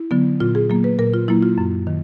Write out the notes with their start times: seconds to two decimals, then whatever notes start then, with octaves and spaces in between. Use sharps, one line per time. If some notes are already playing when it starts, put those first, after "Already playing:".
Already playing: E4
0.11 D3 F#3 B3
0.40 A#2 F4
0.55 G#4
0.70 F#3 A#3
0.84 B4
0.98 A#2 A#4
1.14 F4
1.28 F#3 A#3 E4
1.43 F4
1.58 F#2
1.87 D#3